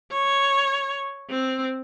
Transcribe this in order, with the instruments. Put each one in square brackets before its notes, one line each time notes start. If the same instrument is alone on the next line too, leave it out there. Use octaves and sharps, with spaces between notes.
[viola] C#5
C4